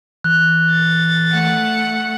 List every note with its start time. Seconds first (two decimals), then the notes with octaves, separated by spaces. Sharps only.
0.24 E3 F#6
0.71 A6
1.29 A3 F#5